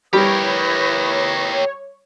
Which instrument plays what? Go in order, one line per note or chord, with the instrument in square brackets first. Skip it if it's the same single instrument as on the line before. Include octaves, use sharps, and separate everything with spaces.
[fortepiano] G3 [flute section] E4 B4 D#6 [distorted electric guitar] G4 A#4 [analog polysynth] C#5